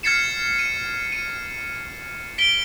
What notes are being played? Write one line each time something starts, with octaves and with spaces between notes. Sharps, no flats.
F6 G#6 A6 C7 C#7 E7
D#7
D#7
B6 D7 G7